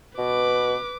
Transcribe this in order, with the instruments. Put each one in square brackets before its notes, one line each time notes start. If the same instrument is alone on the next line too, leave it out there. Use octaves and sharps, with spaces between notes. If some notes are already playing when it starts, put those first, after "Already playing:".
[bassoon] B2 [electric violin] B4 D6